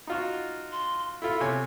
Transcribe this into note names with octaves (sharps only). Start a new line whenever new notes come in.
D#4 F4 F#4
C6
E4 F4 A4
C3 C#5 G#5